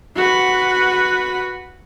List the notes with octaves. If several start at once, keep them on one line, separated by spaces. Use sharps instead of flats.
F#4 B4